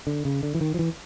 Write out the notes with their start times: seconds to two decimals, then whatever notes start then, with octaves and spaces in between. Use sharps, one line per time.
0.07 D3
0.25 C#3
0.43 D3
0.55 E3
0.61 D#3
0.74 F3
0.79 E3